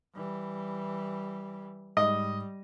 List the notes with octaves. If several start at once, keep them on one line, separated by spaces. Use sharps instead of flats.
E3 G3
G#2 G3 D#5